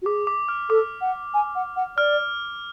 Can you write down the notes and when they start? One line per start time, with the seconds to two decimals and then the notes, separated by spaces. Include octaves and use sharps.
0.02 F#4
0.06 G#4 D6
0.27 D6
0.49 F6
0.70 A4 D6
1.01 F#5
1.34 G#5
1.55 F#5
1.76 F#5
1.97 D5 F6